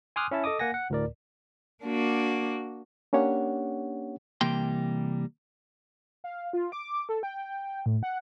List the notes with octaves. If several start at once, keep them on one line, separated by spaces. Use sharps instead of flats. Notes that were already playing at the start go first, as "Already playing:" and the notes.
G#5 C6 D6 D#6 F6 F#6
C#4 E4 E5 A5
A4 D#5 D6 D#6
A#3 F#5 G#5 A#6
F#5
D2 A2 A#4 D5
A#3 D4 F#4
A#3 C#4 D4 G4 C#5 F#5
C3 E3 G3 A#3 G5 C6
F5
F4
D6
A4
G5
A2
F#5